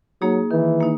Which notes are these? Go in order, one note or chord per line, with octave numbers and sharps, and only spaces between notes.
F#3 A#3 D#4 G#4
D#3 E3
A#3 D#4